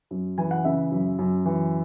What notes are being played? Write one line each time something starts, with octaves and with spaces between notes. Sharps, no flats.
F#2
E3 G#5
F#5
C#3 E5
F#2
F#2
E3